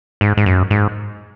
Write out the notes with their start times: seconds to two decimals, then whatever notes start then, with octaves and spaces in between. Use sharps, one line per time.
0.21 G#2
0.37 G#2
0.46 F#2
0.70 G#2